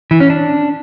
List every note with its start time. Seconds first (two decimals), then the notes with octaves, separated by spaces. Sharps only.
0.11 E3
0.20 C#4
0.30 D4